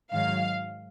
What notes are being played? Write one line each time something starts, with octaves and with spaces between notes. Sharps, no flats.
G#2 D#3 F#3 F5